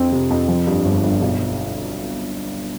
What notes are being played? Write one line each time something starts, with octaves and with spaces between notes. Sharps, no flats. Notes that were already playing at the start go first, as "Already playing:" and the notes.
Already playing: F2 C4
C3
F2
F3
G2
G1
G1
B1